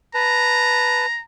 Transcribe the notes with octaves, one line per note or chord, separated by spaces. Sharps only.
B4 A5 A#5